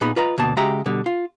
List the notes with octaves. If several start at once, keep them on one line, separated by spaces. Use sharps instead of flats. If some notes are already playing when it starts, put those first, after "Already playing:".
A#2 B3 D#4 G#4 B5
F4 B4 D#5 A#5
D2 B2 A#3 A5
C#3 G#3 F#4 G4 E5 A#5
B2 D3 G3
F4